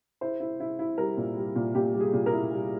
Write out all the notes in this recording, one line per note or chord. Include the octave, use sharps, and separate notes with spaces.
E4 C5
E4
E4
E4
G3 A#4
A#2
G3
A#2
A#2 G4
G3
G#4
A#2
A#4
E4
G3